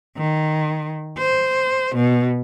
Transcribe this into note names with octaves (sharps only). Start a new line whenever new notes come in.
D#3
C5
B2